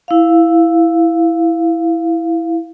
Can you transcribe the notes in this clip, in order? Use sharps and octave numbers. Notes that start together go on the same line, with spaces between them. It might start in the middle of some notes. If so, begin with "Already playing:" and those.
E4 F5